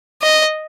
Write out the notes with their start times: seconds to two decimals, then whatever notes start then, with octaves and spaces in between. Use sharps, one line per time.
0.22 D#5